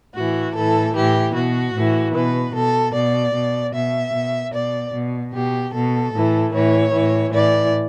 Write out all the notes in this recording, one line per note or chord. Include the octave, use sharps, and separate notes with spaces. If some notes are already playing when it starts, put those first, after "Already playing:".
A2 E3 F#4
A2 E3 A4
A2 E3 G4
B2 F#4
A2 E3
B2 B4
B2 A4
B2 D5
B2
B2 E5
B2
B2 D5
B2
B2 G4
B2 A4
A2 E3
A2 E3 C#5
A2 E3
A2 E3 D5